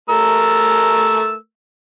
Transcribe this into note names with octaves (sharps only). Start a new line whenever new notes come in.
A3 A#4 E6